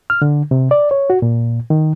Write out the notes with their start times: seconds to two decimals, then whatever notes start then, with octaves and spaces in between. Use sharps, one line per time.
0.10 F6
0.22 D3
0.51 C3
0.71 D5
0.91 C#5
1.10 F#4
1.22 A#2
1.70 D#3